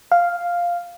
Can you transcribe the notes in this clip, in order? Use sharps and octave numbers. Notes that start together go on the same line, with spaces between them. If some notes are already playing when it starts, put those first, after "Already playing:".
F5